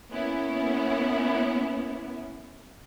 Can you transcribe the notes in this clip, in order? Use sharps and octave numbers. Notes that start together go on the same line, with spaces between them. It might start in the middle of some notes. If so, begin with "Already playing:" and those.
A#3 B3 C#4 E4